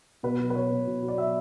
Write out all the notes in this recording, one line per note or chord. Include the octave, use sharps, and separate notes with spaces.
B2 B4
F#3
B4
B2 C#5
B2
B2
F#3
D5
F#3 E5